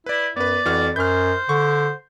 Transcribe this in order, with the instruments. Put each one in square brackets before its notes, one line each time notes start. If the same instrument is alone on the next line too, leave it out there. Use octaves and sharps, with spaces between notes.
[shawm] E4 [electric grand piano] B4 D5
[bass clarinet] F#2 [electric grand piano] B3 B4 [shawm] D5
[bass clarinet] F2 [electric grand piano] E3 F#4 F6
[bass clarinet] F#2 [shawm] C5 [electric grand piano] F6 G6
[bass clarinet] D3 [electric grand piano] C#6